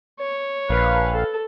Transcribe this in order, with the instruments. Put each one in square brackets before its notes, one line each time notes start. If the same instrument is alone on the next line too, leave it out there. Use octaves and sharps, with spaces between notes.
[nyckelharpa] C#5
[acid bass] A#1 [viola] B4 [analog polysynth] F5
[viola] A4